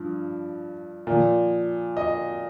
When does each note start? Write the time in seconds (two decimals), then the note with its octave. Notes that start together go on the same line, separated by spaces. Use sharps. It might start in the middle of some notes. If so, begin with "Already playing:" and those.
Already playing: G2 F3
1.07 A#2 F3
1.97 D#5